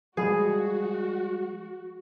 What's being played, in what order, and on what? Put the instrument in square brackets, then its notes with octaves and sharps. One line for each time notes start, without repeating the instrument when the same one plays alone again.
[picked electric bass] F3 G3 G#3 [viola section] F#4 [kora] G#4